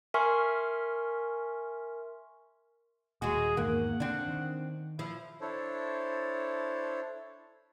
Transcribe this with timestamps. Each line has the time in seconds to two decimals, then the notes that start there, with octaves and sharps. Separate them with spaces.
0.14 A#4 E5 G#5 C6 C#6 F6
3.22 D#1 G#3 F#4 G#4
3.57 E2 G#2 D#3 A#3 F#5
4.00 D3 C4 D4
4.28 D#3
4.99 F3 E4
5.41 D4 E4 A4 C5 C#5